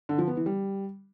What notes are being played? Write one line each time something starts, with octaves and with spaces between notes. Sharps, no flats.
D3
F3
B3
E3
G3